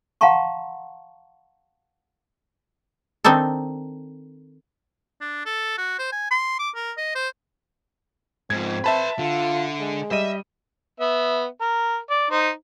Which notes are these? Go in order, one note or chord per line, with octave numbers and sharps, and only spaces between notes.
F5 F#5 A5 A#5 C6 C#6
D#3 C4 D4 D#4 A4
D4
A4
F#4
C5
G#5
C6
D6
A#4
D#5
C5
G#2 F3 C4 G#6
B4 E5 A5 B5 C6
D3 F4
G#3
G3 D#5 E5 D#7
B3 E5
A#4
D5
D#4 C5